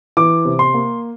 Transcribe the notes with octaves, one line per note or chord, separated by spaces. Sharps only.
E3 D6
C3
C6
A#3